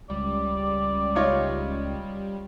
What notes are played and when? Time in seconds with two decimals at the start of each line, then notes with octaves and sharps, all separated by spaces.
0.10 C#2 G3 D5
1.15 D#4 F4 C#5